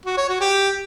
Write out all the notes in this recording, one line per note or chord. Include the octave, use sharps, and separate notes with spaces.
F#4
C#5
F#4
G4